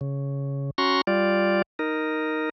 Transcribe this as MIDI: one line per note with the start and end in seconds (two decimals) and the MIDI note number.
0.01 0.70 49
0.78 1.01 61
0.78 1.01 66
0.78 1.01 82
0.78 1.01 84
0.78 1.01 85
1.07 1.62 55
1.07 1.62 65
1.07 1.62 74
1.79 2.49 63
1.79 2.49 70